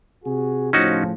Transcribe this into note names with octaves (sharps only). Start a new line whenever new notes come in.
C3 F#4 G#4
A2 C#3 F3 C#4 D#4 F#4